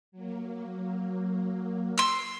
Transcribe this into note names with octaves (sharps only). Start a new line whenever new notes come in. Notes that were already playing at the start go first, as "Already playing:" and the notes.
F#3 A#3
C6 E6